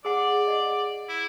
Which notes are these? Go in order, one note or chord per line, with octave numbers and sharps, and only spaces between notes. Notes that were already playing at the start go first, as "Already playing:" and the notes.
G#4 D5 F#5
D#5 F#5
E4